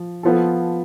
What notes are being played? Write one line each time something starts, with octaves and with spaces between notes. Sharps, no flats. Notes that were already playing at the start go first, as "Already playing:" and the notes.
Already playing: F3
F3 B3 F4 A4